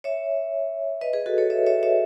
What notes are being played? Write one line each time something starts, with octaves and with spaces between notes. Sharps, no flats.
C#5 E5
B4 D#5
G#4 B4
F#4 A4
A4 C#5
C#5 E5
C#5 E5
C#5 E5